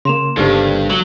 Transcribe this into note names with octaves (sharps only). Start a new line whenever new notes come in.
C#3 A#3 C6 E7 F7
G1 G2 D#4 G4 A4 C5
F#3 F#7 G7